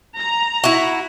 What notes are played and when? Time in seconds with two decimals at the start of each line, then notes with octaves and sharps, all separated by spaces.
0.19 A#5
0.64 E4 F#4